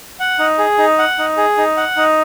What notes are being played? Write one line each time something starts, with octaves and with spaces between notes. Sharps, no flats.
F#5
D#4
G#4
D#4
F#5
D#4
G#4
D#4
F#5
D#4